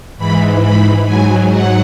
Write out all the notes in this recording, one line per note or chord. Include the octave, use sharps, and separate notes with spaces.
G#2 E3 B5
B5
G#2 F#3 G#5
F#5